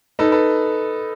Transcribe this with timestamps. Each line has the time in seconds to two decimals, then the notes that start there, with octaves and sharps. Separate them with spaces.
0.19 D#4 A4 B4
0.32 A4 B4